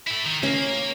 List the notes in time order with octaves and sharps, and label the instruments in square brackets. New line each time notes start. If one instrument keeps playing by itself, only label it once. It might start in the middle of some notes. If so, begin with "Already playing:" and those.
[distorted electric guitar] E4 A4
D#3
[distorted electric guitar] A#3 [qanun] C#4